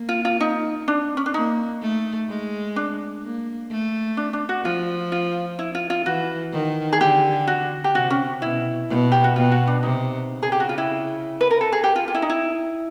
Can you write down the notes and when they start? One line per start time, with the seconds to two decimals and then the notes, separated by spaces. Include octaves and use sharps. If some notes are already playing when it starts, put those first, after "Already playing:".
Already playing: A#3
0.09 F4
0.25 F4
0.41 D#4
0.88 D4
1.17 C#4
1.26 D4
1.34 A#3 D#4
1.82 A3
2.29 G#3
2.76 D4
3.23 A#3
3.70 A3
4.17 D4
4.33 D4
4.49 F#4
4.65 F3 F4
5.12 F4
5.59 E4
5.75 F4
5.90 F4
6.05 E3 F#4
6.53 D#3
6.93 G#4
7.00 D3 G4
7.47 F#4
7.84 G4
7.95 C3 F#4
8.10 C#4
8.42 B2 E4
8.89 B2
9.12 G4
9.24 F#4
9.36 B2 F4
9.52 F#4
9.67 D4
9.83 C3 D#4
10.31 C#3
10.43 G#4
10.52 G4
10.60 F#4
10.69 F4
10.78 E4
11.41 B4
11.51 A#4
11.61 A4
11.72 G#4
11.84 G4
11.96 F4
12.08 F4
12.14 E4
12.22 D#4
12.30 E4